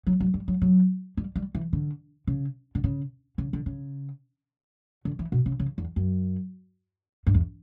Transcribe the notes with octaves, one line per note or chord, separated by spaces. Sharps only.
F#3
F#3
G3
F#3
F#3
G3
G3
E3
D3
C#3
D3
C#3
C#3
D3
C#3
D3
E3
B2
C#3
C#3
E2
F#2
G2
E2